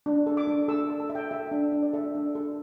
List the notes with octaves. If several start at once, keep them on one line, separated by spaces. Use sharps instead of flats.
D4
A4
D6
D4
A4 E6
A4
A5
A4 E5
G5
A4 E5
D4
D4
D5
A4 E5
D4
A4